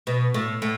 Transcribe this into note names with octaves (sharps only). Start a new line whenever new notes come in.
B2
A2
A2